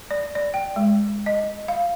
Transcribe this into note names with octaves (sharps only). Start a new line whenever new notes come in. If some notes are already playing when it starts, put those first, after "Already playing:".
D5
D5
G5
G#3
D#5
F5